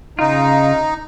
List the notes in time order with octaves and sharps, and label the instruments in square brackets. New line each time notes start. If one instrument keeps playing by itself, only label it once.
[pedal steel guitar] C#3 F4 [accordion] D#4